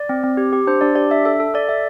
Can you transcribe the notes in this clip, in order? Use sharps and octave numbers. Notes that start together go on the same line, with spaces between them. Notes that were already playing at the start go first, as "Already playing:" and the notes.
Already playing: D5
C4
C4
G4
G4
D4 C5
D4 D5
G4 D5
D4 E5
A4 E5
A4
A4 D5
A4 E5